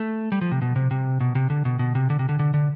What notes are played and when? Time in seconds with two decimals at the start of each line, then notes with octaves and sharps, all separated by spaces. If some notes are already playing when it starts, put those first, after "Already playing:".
Already playing: A3
0.32 G3
0.41 F3
0.51 C3
0.62 B2
0.76 C3
0.91 C3
1.21 B2
1.35 C3
1.50 D3
1.65 B2
1.79 B2
1.95 C3
2.10 D3
2.19 C3
2.29 D3
2.39 D3
2.54 D3